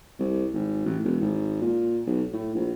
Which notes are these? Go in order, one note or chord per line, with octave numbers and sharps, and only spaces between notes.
C2
G#1
A1
E1
G#1
A#2
B1
A2
A#1